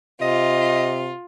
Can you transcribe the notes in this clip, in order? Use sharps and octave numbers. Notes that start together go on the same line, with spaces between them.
C3 F4 D#5